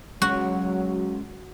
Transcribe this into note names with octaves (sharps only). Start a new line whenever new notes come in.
F#3 G#3 C#4 F#4